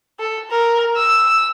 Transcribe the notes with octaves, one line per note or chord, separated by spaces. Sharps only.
A4
A#4
E6